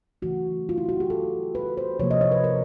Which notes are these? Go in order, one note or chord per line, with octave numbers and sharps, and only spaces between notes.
C#3 E3 A3 F#4
F4
E4
F#4
G4
A4
B4
C5
C3 F3 A#3 C#5
D#5
C#5
B4
A#4